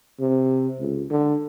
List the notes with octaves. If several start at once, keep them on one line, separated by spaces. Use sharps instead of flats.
C3
C#2
D3